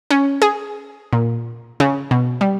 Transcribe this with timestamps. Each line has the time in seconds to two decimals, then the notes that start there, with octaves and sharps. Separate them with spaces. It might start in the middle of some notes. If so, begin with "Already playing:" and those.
0.10 C#4
0.42 G#4
1.13 A#2
1.80 C#3
2.11 B2
2.41 G3